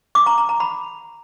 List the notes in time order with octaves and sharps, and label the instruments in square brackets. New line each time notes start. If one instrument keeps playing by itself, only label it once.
[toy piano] D6
A#5
A#5
A#5
B5